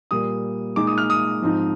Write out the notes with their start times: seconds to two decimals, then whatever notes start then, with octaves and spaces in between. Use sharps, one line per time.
0.11 A#2 G3 A#3 D#6
0.76 A#2 G#3 D#4 D6
0.87 D#6
0.98 F6
1.10 D#6
1.42 G#2 F3 C4 D#4